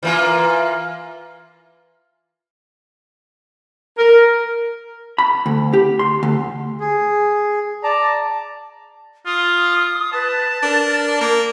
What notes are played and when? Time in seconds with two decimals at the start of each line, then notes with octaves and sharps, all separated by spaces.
0.03 E3 A#3 F4
3.98 A#4
5.18 B5
5.46 D2
5.73 G4
5.99 C6
6.23 D2
6.80 G#4
7.83 D5 A5 A#5
9.26 F4 D#6
10.13 B4 A5
10.63 D4 A#4
11.21 A#3